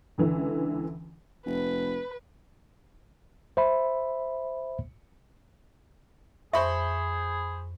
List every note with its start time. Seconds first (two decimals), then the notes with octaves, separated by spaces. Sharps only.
0.18 C#2 D3 E3
1.46 F1 B4
3.57 C5 E5 B5
6.53 F2 G#4 C5 E5 B5 C#6